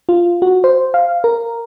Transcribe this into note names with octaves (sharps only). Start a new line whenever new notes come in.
F4
F#4
C5
F5
A#4